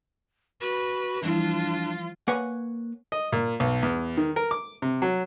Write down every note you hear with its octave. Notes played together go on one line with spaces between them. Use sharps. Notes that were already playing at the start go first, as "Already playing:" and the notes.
F#4 B4
E3 F3 G3 D4 E4 F4
A#3 B4 C#5 F#5 G#5
D#5
A#2
B1
E2
D#3
A#4
D6
C3
F#3